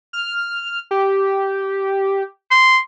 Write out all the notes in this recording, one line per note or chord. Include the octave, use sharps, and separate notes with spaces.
F6
G4
C6